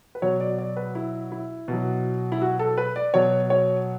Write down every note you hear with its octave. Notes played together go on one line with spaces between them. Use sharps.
B4
B2 F#3 C#5
D5
D5
B4
E4
E4
B2 F#3
E4
F#4
A4
B4
D5
B2 F#3 C#5
C#5